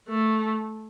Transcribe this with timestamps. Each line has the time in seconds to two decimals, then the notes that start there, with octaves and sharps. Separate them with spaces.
0.08 A3